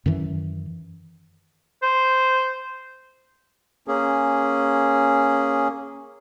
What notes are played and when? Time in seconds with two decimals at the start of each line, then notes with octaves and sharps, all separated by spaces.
0.06 F#2 D#3 E3
1.82 C5
3.88 A#3 C#4 G#4